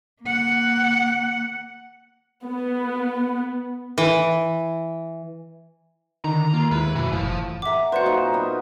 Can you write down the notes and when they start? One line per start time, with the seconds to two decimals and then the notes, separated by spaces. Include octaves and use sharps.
0.22 A#3 F#5
2.44 B3
3.98 E3
6.24 D3 D#3 A#5
6.54 A#3 F4
6.71 D#2 G#3 E4 B4
6.95 F#2 B2 E3 F#4
7.12 F#1 A2 E3 F3
7.62 E5 F#5 A#5 D6
7.92 F#4 B4 C5 D5 F#5
8.06 A#2 D#4 D#5
8.33 B3 A#4